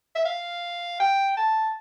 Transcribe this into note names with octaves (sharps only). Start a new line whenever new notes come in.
E5
F5
G5
A5